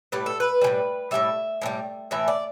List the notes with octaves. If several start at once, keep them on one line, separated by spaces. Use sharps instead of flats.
A2 G3 B4
A4
B4
A2 E3 G3
A2 E3 G3 E5
A2 E3 G3
A2 E3 E5
D5